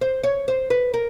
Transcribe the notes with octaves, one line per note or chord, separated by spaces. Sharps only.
C5
C#5
C5
B4
A#4